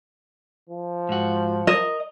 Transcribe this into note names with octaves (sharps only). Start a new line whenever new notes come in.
F3
G#2 F#4
A#4 D#5